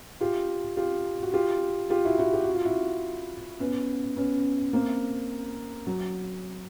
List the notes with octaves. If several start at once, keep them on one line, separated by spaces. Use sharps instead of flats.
F4 G4
F4 G4
F#4
F4 G4
F4 G4
E4 F#4
E4 F#4
G4
F#4
F4
E4 F#4
B3 C#4
B3 C#4
A#3 C4
F#3